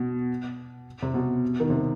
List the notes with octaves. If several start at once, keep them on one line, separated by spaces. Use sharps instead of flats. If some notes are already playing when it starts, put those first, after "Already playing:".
Already playing: B2
C3
B2
D#3
C3